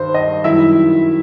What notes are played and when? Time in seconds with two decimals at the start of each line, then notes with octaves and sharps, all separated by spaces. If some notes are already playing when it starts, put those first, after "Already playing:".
Already playing: G2 D#3 G3 C5
0.14 D#5
0.44 F#2 D#3 G3 E4 E5